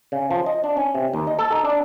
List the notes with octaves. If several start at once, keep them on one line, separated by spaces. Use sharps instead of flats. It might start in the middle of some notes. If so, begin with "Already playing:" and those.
C#3
F3
D#5
D4
C#4
C3
D#2
D#5
A4
D#4
D4